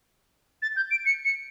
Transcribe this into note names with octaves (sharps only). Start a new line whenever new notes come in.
A6
G6
D7
C#7
C#7